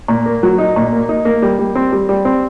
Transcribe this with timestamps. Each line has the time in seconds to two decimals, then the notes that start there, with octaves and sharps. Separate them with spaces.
0.08 A#2
0.26 A#3
0.43 F#3
0.58 D#4
0.76 A#2
0.92 A#3
1.09 D#4
1.25 A#3
1.42 G3
1.59 G3
1.75 C4
1.93 G3
2.09 G3
2.25 C4